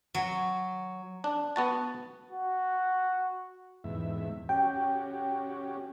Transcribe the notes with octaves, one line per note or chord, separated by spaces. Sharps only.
F#3
D4
B3 F#4 A5
F#4
E2 G#2 E5
C#4 F#4 G4 G5